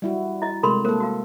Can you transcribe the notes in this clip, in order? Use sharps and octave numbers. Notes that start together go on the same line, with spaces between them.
G3 E4 F#4
E4 D#5
C3 G#3 A3 A#4 B5 C6
A#3 A4 A#4 C5
F#4 F5